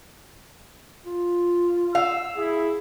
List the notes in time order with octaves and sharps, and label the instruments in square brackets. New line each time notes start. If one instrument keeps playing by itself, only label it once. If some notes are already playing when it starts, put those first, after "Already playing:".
[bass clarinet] F4
[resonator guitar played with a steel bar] F5 [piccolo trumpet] E6
[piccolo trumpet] E4 [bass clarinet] G#4